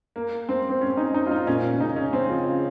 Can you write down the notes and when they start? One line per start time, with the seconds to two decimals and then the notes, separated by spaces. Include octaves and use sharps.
0.16 A#3
0.49 C4
0.70 C4
0.81 C#4
0.97 D#4
1.14 D#4
1.27 F4
1.31 D#4
1.47 A#2 C#4
1.71 C#4
1.80 C#3 D#4
1.96 C#4
2.13 C4
2.30 F3